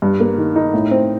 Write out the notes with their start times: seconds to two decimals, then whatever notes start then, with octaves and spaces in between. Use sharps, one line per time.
0.02 G2
0.20 A#3
0.38 D#3
0.56 D#4
0.74 A2
0.91 C4